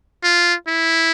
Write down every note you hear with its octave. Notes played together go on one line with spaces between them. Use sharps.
F4
E4